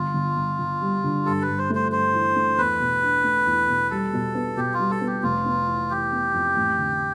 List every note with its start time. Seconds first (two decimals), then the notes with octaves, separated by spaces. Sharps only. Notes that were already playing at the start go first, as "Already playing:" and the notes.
Already playing: G1 F4
0.14 G1
0.37 G1
0.59 G1
0.81 G3
1.04 D3
1.26 G2 A4
1.42 B4
1.47 G2
1.58 C5
1.70 A3 C5
1.91 G2 C5
2.14 E3
2.36 A3
2.58 E2 B4
2.80 B2
3.03 D4
3.24 A3
3.47 E2
3.68 B2
3.91 G3 A4
4.13 B2
4.35 B3
4.57 B2 G4
4.74 F4
4.79 G3
4.90 A4
5.01 B3
5.07 G4
5.23 F1 F4
5.45 B3
5.68 E3
5.90 E3 G4
6.12 B3
6.34 F2
6.56 A1
6.78 D3